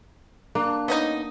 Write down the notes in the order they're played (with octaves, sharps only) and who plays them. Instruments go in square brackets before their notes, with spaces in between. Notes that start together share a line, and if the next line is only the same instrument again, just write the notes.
[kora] A#3 [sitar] D4
[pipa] B3 C#4 D#4 [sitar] D#5